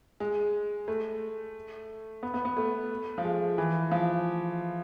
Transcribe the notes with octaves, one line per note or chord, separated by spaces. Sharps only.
G#3
A3
B3
B3
B3
A3
F3
G#3
E3
F3